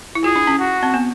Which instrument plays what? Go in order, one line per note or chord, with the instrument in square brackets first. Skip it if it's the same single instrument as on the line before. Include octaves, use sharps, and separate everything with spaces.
[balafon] E4
[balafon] F4 [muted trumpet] G#4
[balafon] D4
C#4
[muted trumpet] F#4
[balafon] C4
B3